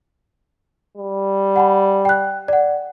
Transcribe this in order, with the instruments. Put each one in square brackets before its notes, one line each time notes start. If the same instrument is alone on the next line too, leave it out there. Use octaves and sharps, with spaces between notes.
[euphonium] G3
[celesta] F#5 G#5 B5
G5 F#6
D5 F#5